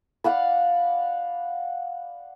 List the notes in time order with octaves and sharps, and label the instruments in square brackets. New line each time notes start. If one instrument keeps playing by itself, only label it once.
[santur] D5 F5 F#5 B5